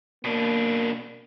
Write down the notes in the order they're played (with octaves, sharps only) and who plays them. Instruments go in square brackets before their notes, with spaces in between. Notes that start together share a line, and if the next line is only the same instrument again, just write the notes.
[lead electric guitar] B2 D4 [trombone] A#3